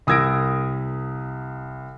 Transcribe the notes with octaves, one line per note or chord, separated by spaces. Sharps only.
C2 D#6 E6 G#6 A#6 D7